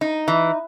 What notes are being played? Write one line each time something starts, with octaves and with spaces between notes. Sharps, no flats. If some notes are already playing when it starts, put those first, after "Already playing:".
D#4
E3